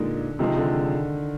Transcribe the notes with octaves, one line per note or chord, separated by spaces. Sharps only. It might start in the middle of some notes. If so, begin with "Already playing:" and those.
Already playing: A#2 D3 G#3 D#4
C3 D#3 F3 G#3 D#4 G#4
D3